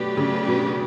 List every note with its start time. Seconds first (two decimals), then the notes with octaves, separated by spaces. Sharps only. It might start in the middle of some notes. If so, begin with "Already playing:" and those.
Already playing: B2 F#3 A3 D4 G4 B4
0.17 C#3
0.47 B2